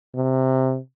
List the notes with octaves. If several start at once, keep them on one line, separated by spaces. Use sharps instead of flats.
C3